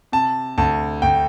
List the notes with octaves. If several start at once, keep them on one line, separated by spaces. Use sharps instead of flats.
C3 A5
D2 A5
D2 G5